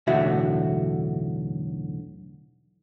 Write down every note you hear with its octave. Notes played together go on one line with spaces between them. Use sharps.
B1 E2 A2 D3 F#4 E5